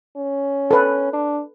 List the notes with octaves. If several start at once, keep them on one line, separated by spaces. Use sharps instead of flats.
C#4
A4 B4
D4